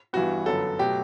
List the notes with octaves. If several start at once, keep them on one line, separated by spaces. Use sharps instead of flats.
G2 E3 G3 B3 F#4
G1 F#2 F#3 B3 A4
B2 F#3 A3 G4